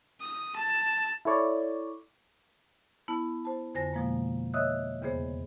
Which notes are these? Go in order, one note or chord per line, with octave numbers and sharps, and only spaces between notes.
D#6
A5
E4 A4 C#5 D5
B3 E4 A5
C5 A5
F2 D3 C5 G#5 A#6
B2 F3 G#3 A#3
C#5 D#5 E5 D#6 E6 F#6
E2 C#3 B3 G#4 C5